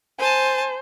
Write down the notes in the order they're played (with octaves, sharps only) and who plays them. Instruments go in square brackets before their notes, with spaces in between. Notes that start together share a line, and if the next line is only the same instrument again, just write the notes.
[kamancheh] C5 [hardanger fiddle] G#5 A5